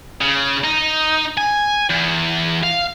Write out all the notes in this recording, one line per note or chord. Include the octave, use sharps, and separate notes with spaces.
C#3
D#4
G#5
E2
F5